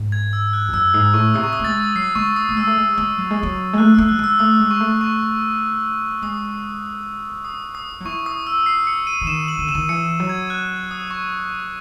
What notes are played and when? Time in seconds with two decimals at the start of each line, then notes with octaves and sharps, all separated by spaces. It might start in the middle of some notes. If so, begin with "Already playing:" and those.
Already playing: G#2
0.12 G#6
0.33 E6
0.53 F#6
0.68 E2
0.73 F#2 E6
0.94 G#2 D#6
1.14 A2 C#6
1.34 C3 D#6
1.44 C#6
1.53 D#6
1.59 A3
1.64 G#3 A6
1.95 F#3 C7
2.15 G#3 C#6
2.36 D#6
2.49 A3
2.57 G#3 E6
2.67 A3
2.77 G#3
2.98 G#3
3.18 F#3
3.31 G#3
3.43 F#3
3.73 G#3
3.78 A3 F#6
3.94 E6
3.98 A3
4.09 F#3 F#6
4.19 G#3 E6
4.39 A3 D#6
4.59 G#3
4.71 C#6
4.80 A3
5.01 C#6
6.22 G#3 D#6
7.45 D#6
7.75 D#6
8.00 F#3
8.05 E3 C#6
8.26 D#6
8.47 E6
8.66 C7
8.87 C#7
9.07 D#7
9.21 E3
9.27 D#3 E7
9.48 F#7
9.59 D#3
9.67 C#3 E7
9.75 D#3
9.89 E3 C#7
10.20 F#3
10.29 G#6
10.50 F#6
10.91 D#6
11.11 C#6